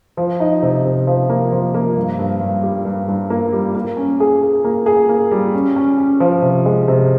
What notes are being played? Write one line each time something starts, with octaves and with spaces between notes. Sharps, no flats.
F3
D#4
C3
C3
F3
A#3
F3
A#3
G2
G2
G2
G3
G2
G2
A#3
G3
A#3
C#4
G#4
G#4
A#3
G#4
A#3
G3
C#4
C#4
C#4
F3
C3
G#3
C3